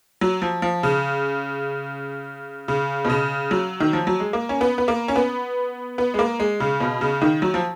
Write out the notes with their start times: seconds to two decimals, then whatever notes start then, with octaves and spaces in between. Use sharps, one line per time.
0.21 F#3
0.42 F3
0.62 F3
0.83 C#3
2.68 C#3
3.05 B2
3.10 C#3
3.51 F#3
3.80 D#3
3.93 F3
4.07 F#3
4.20 G#3
4.33 A#3
4.49 C#4
4.61 B3
4.78 B3
4.88 A#3
5.08 C#4
5.16 B3
5.98 B3
6.14 G#3
6.19 A#3
6.40 G#3
6.60 C#3
6.80 B2
7.01 C#3
7.22 D#3
7.42 F#3
7.54 F3